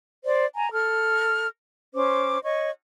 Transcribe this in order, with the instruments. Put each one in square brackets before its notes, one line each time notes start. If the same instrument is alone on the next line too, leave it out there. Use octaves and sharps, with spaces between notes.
[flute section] C5 D5
G#5 A#5
A4 F6
C#4 C5 D6
C#5 D#5 C#6